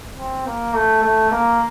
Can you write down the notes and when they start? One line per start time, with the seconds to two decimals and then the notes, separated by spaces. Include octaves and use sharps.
0.17 C4
0.46 A#3
0.74 A3
1.03 A3
1.31 A#3